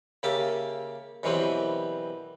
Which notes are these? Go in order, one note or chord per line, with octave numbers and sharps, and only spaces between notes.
C#3 A#3 G4 E5 A5
F#2 B2 E3 G3 C4